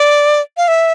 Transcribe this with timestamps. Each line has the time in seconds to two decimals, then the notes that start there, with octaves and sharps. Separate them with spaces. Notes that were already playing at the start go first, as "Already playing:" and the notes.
Already playing: D5
0.57 F5
0.68 E5